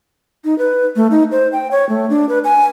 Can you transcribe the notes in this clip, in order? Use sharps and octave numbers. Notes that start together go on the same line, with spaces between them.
D#4
B4
A3
D#4
C5
G5
C#5
A3
D4
B4
G#5